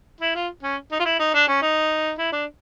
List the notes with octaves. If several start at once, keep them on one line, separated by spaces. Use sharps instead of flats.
E4
F4
C#4
D#4
F4
E4
D#4
D4
C#4
D#4
E4
D4